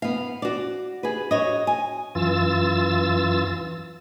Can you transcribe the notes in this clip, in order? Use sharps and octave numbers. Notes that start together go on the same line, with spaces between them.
B3 F5
F#4 D5
G#4 B4
F#4 C#5 D#5
G#5
F#2 E3 F4 E6 A6